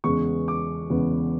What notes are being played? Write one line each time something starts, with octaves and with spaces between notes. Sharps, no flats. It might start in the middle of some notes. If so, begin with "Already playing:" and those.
E2 C#3 G#3 B3 C#6
D6
E2 C#3 G#3 B3